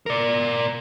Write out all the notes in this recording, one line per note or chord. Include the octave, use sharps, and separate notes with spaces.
A#4 D5